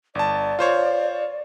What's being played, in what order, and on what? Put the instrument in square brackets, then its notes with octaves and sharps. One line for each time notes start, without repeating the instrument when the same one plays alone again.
[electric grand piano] G1 A5 [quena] D5
[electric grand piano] F4 C5 C#5